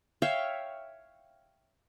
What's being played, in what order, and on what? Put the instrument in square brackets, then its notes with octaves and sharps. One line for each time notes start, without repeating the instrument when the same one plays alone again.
[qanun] C#5 E5 F5 G5